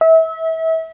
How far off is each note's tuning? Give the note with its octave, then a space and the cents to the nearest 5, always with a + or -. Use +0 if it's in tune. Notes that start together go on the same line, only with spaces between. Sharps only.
E5 -30